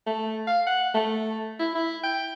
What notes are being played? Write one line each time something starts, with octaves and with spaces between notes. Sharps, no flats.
A3
F5
F#5
A3
E4
E4
G5